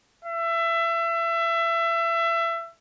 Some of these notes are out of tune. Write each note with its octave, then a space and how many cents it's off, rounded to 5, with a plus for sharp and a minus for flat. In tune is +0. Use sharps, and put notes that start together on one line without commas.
E5 +25